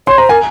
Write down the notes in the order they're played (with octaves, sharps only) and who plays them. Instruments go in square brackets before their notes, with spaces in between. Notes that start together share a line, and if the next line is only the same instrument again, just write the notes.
[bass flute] C#5 [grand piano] C6
[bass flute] C5 [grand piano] A#5
[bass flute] A#4 [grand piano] G#5